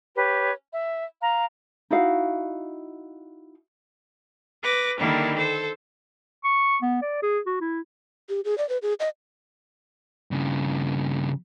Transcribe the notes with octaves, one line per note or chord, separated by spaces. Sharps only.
G4 B4 C#5
E5
F5 A#5
D#4 E4 F#4 F5
B4 D6 A#6
D3 D#3 G3 A#3 E4
A4 C5 E6
C#6
B3
D5
G#4
F#4
E4
G4
G#4
D5
B4
G#4
D#5
G2 C#3